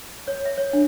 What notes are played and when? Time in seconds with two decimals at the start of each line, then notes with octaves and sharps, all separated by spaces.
0.28 C#5
0.45 E5
0.58 C#5
0.73 D4